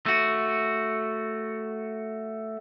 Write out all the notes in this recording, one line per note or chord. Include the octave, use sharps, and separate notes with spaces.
A3 F#4